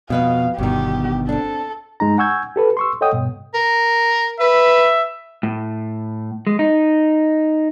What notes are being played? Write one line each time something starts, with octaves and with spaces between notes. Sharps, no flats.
F2 B2 B4 D#5 F5
G1 G2 B2 D#3 G4
C4 D4 A4
G2 G#3 D#4 A#5
F#5 G#5 C#6 E6 G6 G#6
G4 A4 B4
C6 C#6 E6
A4 C#5 D#5 F#5 G5 D#6
G2 B2
A#4
B4 E5
A2
G#3
D#4